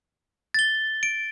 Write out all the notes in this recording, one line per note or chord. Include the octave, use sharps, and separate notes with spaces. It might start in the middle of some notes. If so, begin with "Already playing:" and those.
A6 G7
D7